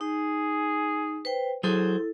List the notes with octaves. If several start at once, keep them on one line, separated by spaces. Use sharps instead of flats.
D#4 G#4
B4 C5 G5
F#3 E4 G#4 A4 C5